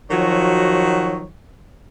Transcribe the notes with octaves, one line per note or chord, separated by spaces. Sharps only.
D#3 F3 F#3 F#4 C#5